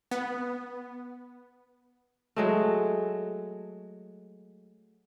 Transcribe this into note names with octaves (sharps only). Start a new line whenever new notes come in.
B3
F#3 G#3 A3